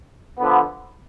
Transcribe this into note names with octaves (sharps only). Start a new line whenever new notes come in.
D3 F3 B3